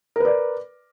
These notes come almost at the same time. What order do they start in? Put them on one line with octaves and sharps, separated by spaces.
A#4 B4 D5